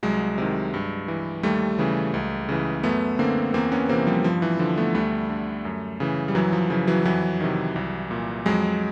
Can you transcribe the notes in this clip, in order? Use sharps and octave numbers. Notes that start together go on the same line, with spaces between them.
C2 F#3 G#3
C3 D#3
G2
E3
D#2 G3 A3
C#3 E3
C#2
C#3 E3
F#2 A3 B3
D3 A#3 C4
E2 A#3 C4
B3 C#4
C3 E3 A#3 C4
F3 G3
G2 F3
E3
D3 F3
A3 B3
D2 G3 A3
D3
F#2
C#3 E3
G3
F#2 E3 F#3
F3
C#3 E3 F3
E3 F#3
F2 E3 F#3
C3 D#3
C2
A#2
F2 F#3 G#3